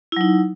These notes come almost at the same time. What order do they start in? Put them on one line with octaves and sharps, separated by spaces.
E4 F#3 D#4